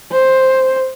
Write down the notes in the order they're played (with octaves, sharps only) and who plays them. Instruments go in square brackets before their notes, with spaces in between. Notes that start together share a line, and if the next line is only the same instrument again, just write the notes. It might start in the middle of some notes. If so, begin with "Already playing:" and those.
[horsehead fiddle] C5